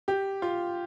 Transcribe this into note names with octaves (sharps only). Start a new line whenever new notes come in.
G4
F4